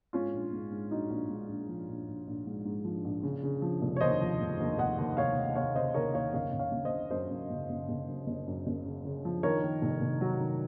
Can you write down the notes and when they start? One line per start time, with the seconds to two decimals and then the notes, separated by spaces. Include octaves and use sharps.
0.13 G#2 C#4 F4
0.34 A#1
0.53 G#2
0.71 G#2
0.91 A#1 D#4 F#4
1.10 A#1
1.30 G#2
1.49 A#1
1.69 F3
1.89 A#1
2.08 A#1
2.27 A#1
2.47 G#2
2.65 G#2
2.85 F3
3.05 A#1
3.23 C#3
3.43 C#3
3.62 F3
3.82 F1
3.96 C#5
4.01 D#2 C5 D#5
4.21 F3
4.41 F1
4.60 D#2
4.78 F1 D#5 F#5
4.98 D#2
5.17 F1 C#5 F5
5.37 F1
5.56 F1 C#5 F5
5.75 C#3 C5 D#5
5.94 D#2 A#4 C#5
6.14 D#2 C#5 F5
6.34 F#1 C#5 F5
6.53 F#1
6.59 C#5 F5
6.72 F#1
6.85 C5 D#5
6.92 C#3
7.11 F#2 C5 D#5
7.31 F#2
7.50 F#1
7.70 F#1
7.89 F#1
8.08 F#2
8.27 F#1
8.47 F#2
8.67 F#1
8.86 C#3
9.05 C#3
9.25 F3
9.43 D#3 A#4 C#5
9.64 D#3
9.82 F1
10.01 F1
10.21 F#3
10.41 D#3